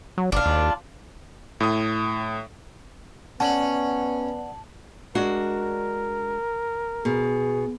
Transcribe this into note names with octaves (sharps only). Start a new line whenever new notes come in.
F#3
G1 D4 F4
D#2
A2 D#6
B3 C#4 D5 F#5 A5 F#7
G#3 D4 F#4 A#4
B2 G#4